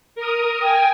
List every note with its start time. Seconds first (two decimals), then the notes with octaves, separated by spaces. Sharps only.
0.15 A#4 D#6
0.62 G5 G#5